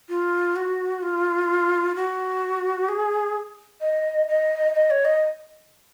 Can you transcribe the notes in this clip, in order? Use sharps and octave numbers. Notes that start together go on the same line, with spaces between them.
F4
F#4
F4
F#4
G#4
D#5
D#5
D#5
C#5
D#5